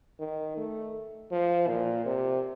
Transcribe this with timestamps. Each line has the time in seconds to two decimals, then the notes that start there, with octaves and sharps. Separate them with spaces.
0.20 D#3
0.57 A3
1.32 F3
1.68 A#2
2.06 C3